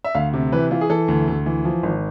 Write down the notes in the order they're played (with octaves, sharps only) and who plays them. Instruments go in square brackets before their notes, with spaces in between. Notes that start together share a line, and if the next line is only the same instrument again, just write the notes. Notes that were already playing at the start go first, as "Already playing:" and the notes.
[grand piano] E5
D2 F5
C3
E3 B4
E3 F4
G#4
E3 A4
D2
D2
E3
F3
G#1